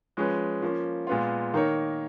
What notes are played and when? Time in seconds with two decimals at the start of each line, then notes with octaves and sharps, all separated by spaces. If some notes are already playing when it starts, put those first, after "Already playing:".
0.17 F3 G#3 C#4 G#4 B4
0.62 F3 A#3 C#4
1.07 A#2 G#3 B3 F4
1.54 D#3 A#3 D#4 A#4 C#5